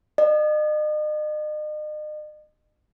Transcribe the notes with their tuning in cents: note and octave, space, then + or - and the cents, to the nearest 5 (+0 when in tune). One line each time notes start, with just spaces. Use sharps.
D#5 -40